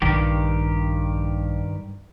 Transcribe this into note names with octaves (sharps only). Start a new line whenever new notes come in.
A#1 G2 D#3 G4